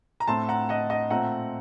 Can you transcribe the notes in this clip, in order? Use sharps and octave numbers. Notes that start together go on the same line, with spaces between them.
A#5
A2 A3 C4 A5 C6
F#5 A#5
D#5 F#5
D#5 F#5
A#2 A3 C4 F#5 A#5